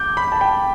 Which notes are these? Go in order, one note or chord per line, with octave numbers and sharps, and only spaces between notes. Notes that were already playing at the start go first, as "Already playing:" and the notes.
Already playing: D6 G6
B5
A5
G5